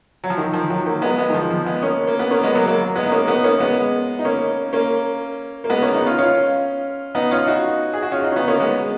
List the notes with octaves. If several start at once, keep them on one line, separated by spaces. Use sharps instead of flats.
F#3
F3
D#3
F3
D#3 F#3
F#3 A#3
G#3 B3
G#3 B3
D#3
F3
F3
G#3 B3
A#3 C#4
A#3
B3
A#3 C#4
G#3 B3
F#3 A#3
F#3 A#3
G#3 B3
D#4
A#3 C#4
B3 D#4
A#3 C#4
A#3
G#3 B3
D#4
A#3 C#4
A#3 C#4
A#3
G#3 B3
A#3 C#4
B3 D#4
C#4 F4
C#4 F4
B3 D#4
C#4 F4
D#4 F#4
G#4
F#4
C#4 F4
D#4 F#4
C#4
B3 D#4
A#3 C#4
G#3 B3